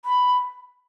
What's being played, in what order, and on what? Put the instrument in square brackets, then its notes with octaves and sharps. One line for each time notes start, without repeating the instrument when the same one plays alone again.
[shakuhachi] B5